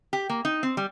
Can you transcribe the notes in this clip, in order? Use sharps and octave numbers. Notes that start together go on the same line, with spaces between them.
G4
A#3
D#4
C4
G3